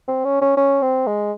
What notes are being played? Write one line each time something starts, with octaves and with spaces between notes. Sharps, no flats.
C4
C#4
C#4
C#4
C4
G#3